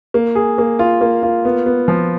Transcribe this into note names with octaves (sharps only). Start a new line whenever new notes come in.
A#3
G#4
A#3
F4
A#3
F4
B3
B3
F3